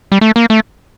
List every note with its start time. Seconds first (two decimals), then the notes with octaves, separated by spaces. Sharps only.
0.12 G3
0.21 A3
0.36 A#3
0.50 A3